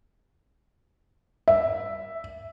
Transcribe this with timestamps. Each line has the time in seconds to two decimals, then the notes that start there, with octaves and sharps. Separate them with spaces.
1.48 E5